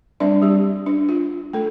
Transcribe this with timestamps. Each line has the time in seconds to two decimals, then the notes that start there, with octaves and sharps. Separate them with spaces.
0.20 G3 C4 D4 D5
0.42 G3 G4
0.86 D4
1.09 F4
1.53 A3 A4